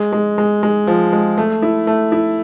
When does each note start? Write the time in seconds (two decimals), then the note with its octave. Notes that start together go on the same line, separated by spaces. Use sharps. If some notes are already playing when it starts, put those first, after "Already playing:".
Already playing: G#3
0.13 G#3
0.38 G#3
0.63 G#3
0.87 F3
1.13 G#3
1.38 A3
1.62 E4
1.87 A3
2.12 E4